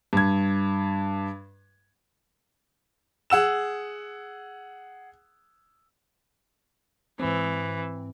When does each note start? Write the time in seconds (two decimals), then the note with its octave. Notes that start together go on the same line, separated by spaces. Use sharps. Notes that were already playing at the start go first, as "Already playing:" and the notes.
0.13 G2 G#6
3.30 G#4 F#5 E6 E7
7.20 G#2 E3 C4